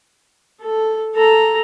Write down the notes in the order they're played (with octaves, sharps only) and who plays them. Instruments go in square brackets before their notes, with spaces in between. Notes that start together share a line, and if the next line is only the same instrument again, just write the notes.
[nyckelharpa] A4
A4 A#5